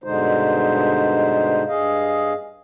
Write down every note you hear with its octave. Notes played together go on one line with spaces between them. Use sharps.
G2 B2 D3 G#3 D#4 C5
G2 G#4 D#5 F5